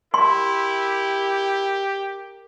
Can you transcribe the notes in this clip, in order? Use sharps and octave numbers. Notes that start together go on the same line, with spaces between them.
E4 G4 A#4 C6